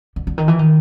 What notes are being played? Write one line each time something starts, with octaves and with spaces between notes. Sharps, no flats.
D3
D3
D#3
E3
D#3